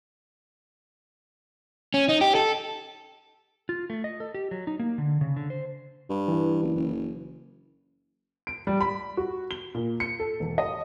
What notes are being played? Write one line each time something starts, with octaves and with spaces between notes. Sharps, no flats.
C#4
D#4
G4
A4
F4
A3
D#5
A4
G4
F#3
D#4
A#3
D3
C#3
D3
C5
G2
E3 E4
F#1
F#1
D7
G3
B5
F#4
G7
A#2
C#7
A4
E1
D#5